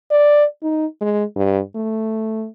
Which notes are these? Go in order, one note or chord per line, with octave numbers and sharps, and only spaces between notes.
D5
D#4
G#3
G2
A3